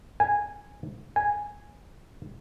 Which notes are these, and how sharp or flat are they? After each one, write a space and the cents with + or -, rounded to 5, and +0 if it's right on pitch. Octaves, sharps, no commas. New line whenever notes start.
G#5 -10
G#5 -5